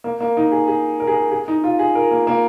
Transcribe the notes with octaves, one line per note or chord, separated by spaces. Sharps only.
A#3
A#3
D#4
G#4
G#4
A#4
G#4
A#4
G#4
D#4
F4
G#4
A#4
A#3
A#3